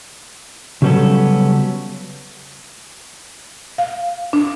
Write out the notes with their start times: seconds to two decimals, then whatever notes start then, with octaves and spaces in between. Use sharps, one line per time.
0.82 C#3 F#3 G3 B3 C#4 A4
3.78 F5
4.33 D4